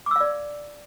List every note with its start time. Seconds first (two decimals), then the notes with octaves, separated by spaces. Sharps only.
0.06 D6
0.11 E6
0.16 F5
0.20 D5